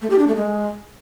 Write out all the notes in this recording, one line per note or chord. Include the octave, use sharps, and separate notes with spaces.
A3
G4
D4
A3
G#3